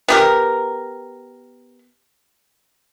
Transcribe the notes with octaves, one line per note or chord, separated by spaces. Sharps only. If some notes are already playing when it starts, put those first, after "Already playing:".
B3 G4 A#4